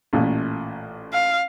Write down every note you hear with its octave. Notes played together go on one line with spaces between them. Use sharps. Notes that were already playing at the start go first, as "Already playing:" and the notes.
A1 A#2 A3
F5